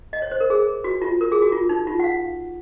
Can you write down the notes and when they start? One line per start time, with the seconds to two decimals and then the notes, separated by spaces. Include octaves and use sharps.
0.13 D#5
0.22 C#5
0.31 C5
0.40 A#4
0.50 G#4
0.84 F#4
1.02 F4
1.21 A#4
1.32 G#4
1.42 F#4
1.52 F4
1.69 D#4
1.87 F4
1.99 F#5
2.04 F5